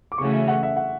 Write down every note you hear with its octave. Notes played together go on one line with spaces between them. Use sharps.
D6
C#3 E3 A3 C#4 F#4 C#6
E5
F#5
E5
F#5